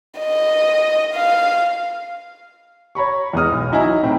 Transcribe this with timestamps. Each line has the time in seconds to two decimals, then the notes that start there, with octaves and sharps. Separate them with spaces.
0.19 D#5
1.14 F5
2.95 C#5 A#5 B5 C#6
3.33 E2 G#3 B3 D#5 D#6 F6
3.52 B1
3.72 F#3 D#4 E4 G#5 A#5
3.83 D#4
4.03 A2 C4